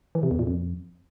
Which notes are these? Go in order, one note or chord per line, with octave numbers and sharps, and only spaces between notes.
E3
C3
E2
A#2
F2